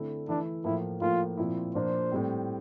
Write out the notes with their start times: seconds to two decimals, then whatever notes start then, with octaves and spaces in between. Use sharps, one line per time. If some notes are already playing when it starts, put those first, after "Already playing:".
Already playing: D3 A3 C4 E4
0.28 E3 A3 D4 E4
0.64 A2 F3 A#3 E4
1.01 A2 F3 A#3 F4
1.37 A#2 F3 C4 E4
1.75 A#2 F3 A#3 D4 C5
2.12 A2 G3 C4